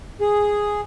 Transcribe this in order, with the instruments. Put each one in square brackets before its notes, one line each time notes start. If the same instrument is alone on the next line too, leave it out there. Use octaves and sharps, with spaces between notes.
[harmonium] G#4